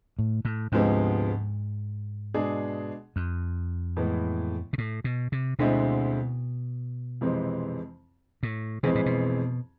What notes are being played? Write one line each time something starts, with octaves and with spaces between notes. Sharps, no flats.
A2
A2
D2 G#2 C3 F3 G#3 B3
B2 G#3 D4 G#4
F2
A2 E3 G#3 B3
B2
A2
B2
C3
D2 B2 D3 G#3 C4 E4
F2 C3 E3 G#3 C4
A2
F2 B2 E3 G#3 C4 G#4
A2
B2